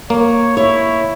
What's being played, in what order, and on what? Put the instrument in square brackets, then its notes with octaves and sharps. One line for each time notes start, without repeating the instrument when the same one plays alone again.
[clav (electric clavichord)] A#3 [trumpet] C#5
[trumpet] E4 [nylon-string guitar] C#5